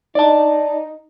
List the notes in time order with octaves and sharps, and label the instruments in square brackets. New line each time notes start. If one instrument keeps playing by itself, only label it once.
[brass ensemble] D#4 [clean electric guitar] D5 A5